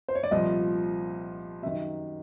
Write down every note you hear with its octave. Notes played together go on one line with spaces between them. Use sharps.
C5
C#5
D5
C2 A#2 F3 D#5
F#2 D#3 E5